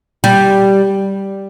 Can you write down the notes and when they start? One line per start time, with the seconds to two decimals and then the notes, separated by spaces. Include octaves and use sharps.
0.24 G3